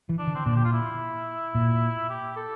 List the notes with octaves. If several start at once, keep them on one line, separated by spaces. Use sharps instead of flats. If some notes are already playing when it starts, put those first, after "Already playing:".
E3
D4
D3
C4
A#2 D4
G4
F4
E4
A#2
G4
A4